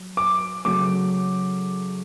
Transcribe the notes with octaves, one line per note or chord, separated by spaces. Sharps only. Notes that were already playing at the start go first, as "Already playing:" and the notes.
Already playing: F#3
D6
C#3 F#3 A3 D6